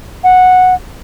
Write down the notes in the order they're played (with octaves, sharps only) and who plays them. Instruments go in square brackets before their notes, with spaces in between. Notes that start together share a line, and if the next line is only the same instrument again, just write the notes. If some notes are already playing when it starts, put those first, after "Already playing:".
[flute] F#5